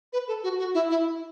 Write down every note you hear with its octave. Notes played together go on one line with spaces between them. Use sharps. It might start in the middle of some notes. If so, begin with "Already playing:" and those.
B4
A4
F#4
F#4
E4
E4